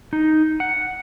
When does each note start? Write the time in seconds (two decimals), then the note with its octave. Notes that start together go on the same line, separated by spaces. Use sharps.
0.13 D#4
0.60 F#5